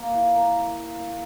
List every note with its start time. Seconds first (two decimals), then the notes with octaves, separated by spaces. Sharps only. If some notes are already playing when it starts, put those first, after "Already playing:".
Already playing: A#3
0.14 E4
0.35 A#4